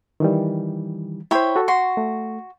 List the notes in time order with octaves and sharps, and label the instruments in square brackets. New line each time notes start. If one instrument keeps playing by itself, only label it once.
[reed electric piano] D#3 E3 G3
[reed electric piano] E4 C5 [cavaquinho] C#5 G5 B5
[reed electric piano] F#4 A4
[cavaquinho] F#4 C6 [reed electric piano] C#6
[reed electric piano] A3